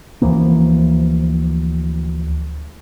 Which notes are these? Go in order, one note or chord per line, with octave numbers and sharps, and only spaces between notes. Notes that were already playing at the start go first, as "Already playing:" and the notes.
D2 E3 F3 A#3